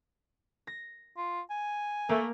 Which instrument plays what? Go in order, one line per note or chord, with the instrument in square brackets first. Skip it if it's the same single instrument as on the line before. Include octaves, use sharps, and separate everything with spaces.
[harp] A#6
[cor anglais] F4
G#5
[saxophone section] A3 [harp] A#3